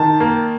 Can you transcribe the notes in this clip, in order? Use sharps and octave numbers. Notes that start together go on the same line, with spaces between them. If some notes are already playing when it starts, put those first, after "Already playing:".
Already playing: D#3 A5
A#3